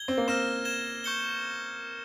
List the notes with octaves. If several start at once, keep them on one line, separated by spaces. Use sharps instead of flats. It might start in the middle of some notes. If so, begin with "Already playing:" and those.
Already playing: G#6 G7
C4
A#3
C4 F6 A#6 E7
G#6 E7 G7
C#6 G6 C#7 G7